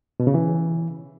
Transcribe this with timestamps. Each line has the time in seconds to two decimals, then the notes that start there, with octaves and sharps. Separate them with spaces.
0.20 B2
0.27 C#3
0.34 E3